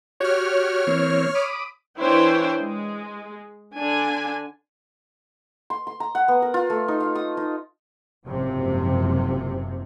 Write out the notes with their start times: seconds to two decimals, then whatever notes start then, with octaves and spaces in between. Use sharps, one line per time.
0.20 F#4 G4 C#5 F6
0.87 E3 A#3 C4
1.35 B5 D6 D#6
1.99 E3 D4 E4 C5 C#5 G5
2.60 G#3
3.76 D3 D4 G#5
5.70 C6
5.87 C6
6.00 A#5
6.15 F#5
6.28 B3
6.42 A#4
6.54 F4
6.70 A3
6.88 D#4
7.00 F5
7.15 D#6
7.37 D#4
8.25 F#1 G#2 C3 F3